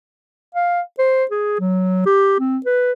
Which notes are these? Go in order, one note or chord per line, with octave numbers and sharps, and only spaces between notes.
F5
C5
G#4
F#3
G4
C4
B4